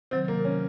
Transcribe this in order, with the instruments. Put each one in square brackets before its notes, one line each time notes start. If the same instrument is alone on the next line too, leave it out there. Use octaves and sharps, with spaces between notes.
[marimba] C3 D#3 F#3 [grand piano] C4
[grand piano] A#3
C#4